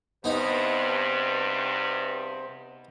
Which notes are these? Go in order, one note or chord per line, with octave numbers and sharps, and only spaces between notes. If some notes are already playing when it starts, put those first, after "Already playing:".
E2 G2 C3 B3 D#4 C5